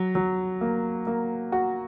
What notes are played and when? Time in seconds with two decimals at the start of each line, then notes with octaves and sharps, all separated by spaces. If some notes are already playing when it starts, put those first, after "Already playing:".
Already playing: F#3
0.15 F#3
0.61 A#3
1.07 A#3
1.52 F#4